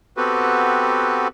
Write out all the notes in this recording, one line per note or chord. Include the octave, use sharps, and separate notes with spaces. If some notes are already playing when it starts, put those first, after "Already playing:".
B3 C4 F#4 G4 A4 B4